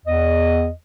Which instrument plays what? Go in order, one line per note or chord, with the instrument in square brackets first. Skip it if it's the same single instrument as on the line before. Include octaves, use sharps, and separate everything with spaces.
[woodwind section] E2 D#5